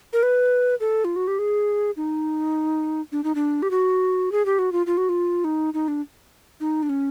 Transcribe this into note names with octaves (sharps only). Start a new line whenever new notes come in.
A#4
B4
A4
F4
F#4
G4
G#4
D#4
D4
D#4
D4
G4
F#4
G#4
G4
F#4
F4
F4
F#4
F4
D#4
D#4
D4
D#4
D4
C#4